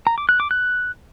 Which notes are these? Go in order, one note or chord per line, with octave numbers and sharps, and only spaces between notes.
A#5
D6
F#6
D6
F#6